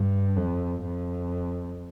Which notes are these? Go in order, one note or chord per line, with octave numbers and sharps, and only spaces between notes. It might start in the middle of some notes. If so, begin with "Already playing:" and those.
Already playing: G2
F2
F2